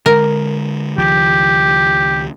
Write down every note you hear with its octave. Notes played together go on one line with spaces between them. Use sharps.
D3 G#3 A#4
C#2 D#3 F3 G4